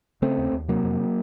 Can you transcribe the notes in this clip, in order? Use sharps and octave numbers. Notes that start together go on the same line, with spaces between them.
C#3 A3 C4
D#2
D#2
C3 F#3 A#3
F2